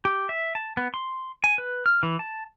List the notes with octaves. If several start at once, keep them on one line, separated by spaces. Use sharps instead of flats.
G4
E5
A5
B3
C6
G#5
B4
F6
E3
A5